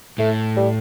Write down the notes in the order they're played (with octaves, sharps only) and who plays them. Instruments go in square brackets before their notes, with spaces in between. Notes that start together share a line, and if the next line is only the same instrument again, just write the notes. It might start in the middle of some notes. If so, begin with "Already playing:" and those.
[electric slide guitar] A2 [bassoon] A3
[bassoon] G3